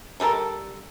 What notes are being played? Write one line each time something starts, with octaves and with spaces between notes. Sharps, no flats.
D3 G3 A4 A#4